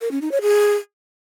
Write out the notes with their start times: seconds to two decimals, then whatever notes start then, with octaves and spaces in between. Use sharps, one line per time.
0.01 A#4
0.11 C#4
0.21 D#4
0.31 C#5
0.42 G#4